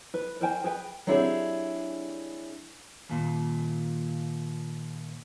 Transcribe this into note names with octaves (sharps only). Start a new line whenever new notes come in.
B4
A#4 C5 G5 G#5
G#4 B4 G5
F#3 C4 D4 E4 G4 G#4
D#2 A#2